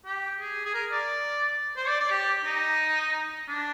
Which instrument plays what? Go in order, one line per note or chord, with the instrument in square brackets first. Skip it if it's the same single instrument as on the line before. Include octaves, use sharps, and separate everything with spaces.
[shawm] G4
G#4
G#4
A#4
D5
C5
D5
D5
G4
D#4
D4